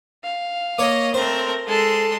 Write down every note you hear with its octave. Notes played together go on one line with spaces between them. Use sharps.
F5
A#3 C#5 D#5
A3 C4 A#4 C5
G#3 A4 A5 C6